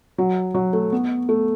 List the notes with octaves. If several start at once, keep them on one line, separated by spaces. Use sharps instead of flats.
F#3
F#3
A3
B3
A3